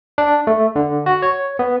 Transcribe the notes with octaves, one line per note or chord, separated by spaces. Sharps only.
D4
A3
D3
F#4
C#5
B3